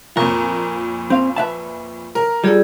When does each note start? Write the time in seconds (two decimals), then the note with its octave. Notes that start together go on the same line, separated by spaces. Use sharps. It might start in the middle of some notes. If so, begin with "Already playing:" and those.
0.17 F2 A#2 A#4 C#6
1.10 C4 F5
1.36 B4 E5 A5
2.15 A#4
2.44 G3 F4 G#4 A4 D5